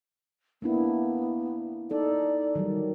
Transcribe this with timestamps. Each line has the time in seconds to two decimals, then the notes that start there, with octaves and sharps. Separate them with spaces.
0.62 A#3 B3 D4 E4
1.91 D#4 A4 D5
2.55 D#3 F#3 G3